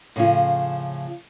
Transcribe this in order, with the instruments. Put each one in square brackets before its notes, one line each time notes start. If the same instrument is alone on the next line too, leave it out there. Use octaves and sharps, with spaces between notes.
[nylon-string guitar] A2 C#3 F3 F4